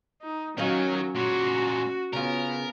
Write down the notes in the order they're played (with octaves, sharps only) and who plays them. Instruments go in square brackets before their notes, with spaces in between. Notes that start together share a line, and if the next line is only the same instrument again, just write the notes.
[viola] D#4
[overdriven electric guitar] D#3 [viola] F#3 [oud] C#4 D#5 F5
[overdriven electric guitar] A#2 G#3 [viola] F#4
[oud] C#3 C#4 F4 [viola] B3 [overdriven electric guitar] A#4